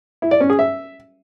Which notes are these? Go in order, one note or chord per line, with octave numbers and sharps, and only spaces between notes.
E4
D5
C#4
G#4
E5